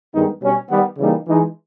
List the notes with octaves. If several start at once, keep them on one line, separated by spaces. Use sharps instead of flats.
G2 D#3 G#3 B3 D#4
B2 G3 C#4
D#3 G3 B3
C#3 E3 G3 A#3 D#4
E3 G#3 D#4